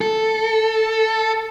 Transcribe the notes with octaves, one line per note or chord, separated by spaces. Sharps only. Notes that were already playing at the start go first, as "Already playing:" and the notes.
A4